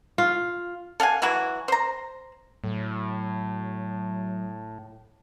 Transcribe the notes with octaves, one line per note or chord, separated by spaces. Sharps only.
F4
A4 F5 F#5 G#5
E3 F#3 E4 F#4
C5 A#5
A2 F#3